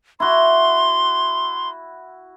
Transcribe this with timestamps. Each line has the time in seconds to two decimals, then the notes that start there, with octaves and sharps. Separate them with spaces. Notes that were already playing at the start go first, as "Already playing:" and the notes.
0.20 E4 F#4 C6